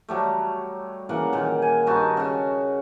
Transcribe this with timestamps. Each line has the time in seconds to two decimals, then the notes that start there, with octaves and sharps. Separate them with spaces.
0.09 F#3 G3 A3
1.09 C#3 E3 A#3 F#5
1.33 A#2 D#3
1.62 G#5
1.87 G2 D#4 F#4 A5
2.17 C#3 F#4